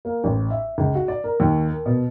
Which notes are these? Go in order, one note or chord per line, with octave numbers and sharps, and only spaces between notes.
A#3
A1
E5
C#2
F#4
D5
A#4
D#2
A#4
B2